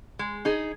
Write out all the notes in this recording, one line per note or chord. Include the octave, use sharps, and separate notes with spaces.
G#3
D#4 G#4